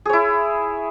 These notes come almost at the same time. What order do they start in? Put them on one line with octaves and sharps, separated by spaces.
G#4 C#5 E4